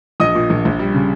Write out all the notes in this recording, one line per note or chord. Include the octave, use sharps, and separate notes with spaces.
A#1 D#5 D#6
A#2
A#1
A#1
G3
C#3